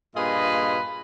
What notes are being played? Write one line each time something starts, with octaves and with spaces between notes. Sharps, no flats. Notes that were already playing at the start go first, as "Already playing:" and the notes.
G2 A#2 F4 G#4 B4 D#5